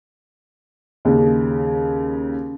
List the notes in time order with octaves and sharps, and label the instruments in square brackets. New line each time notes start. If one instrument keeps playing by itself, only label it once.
[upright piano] D#2 C#3